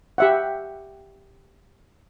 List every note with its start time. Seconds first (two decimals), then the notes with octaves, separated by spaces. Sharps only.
0.18 G4 E5 F#5